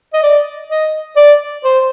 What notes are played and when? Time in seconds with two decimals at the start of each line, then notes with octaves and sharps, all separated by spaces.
0.14 D#5
0.23 D5
0.70 D#5
1.17 D5
1.65 C5